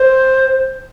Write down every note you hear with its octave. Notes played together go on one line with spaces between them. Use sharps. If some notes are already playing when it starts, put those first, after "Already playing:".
Already playing: C5